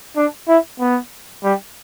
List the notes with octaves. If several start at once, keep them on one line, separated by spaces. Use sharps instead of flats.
D4
E4
B3
G3